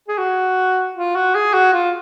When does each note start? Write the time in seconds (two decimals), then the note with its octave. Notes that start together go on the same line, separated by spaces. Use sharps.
0.08 G#4
0.18 F#4
0.96 F4
1.15 F#4
1.35 G#4
1.54 F#4
1.73 F4